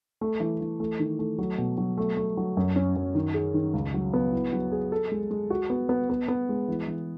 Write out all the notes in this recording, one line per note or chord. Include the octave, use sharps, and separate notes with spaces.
A3
E3
E3
A3
D#3
A3
F#3
B2
F#3
A3
A3
F#3
F#2
C#4
F#2
D#3
G#4
D#3
C#2
F#3
B3
E4
F#3
G#4
A4
G#3
G#3
F#4
B3
B3
B3
B3
G#3
E3
E3